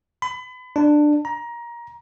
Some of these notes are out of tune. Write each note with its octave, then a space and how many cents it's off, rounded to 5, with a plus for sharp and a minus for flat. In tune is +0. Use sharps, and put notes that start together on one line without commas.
B5 +35
D4 +15
A#5 +20